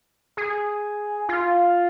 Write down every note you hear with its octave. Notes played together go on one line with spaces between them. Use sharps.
G#4
F4